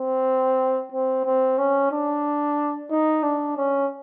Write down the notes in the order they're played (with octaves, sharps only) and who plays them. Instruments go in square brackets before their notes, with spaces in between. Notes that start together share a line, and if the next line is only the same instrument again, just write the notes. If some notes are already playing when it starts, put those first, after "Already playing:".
Already playing: [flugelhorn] C4
C4
C4
C#4
D4
D#4
D4
C#4